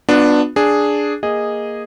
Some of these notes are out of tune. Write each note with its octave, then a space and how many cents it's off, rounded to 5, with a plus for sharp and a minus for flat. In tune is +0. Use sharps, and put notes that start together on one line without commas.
B3 +0 D4 +10 F4 +45
D4 +0 G#4 +0
A#3 +0 G#4 -10 D#5 +0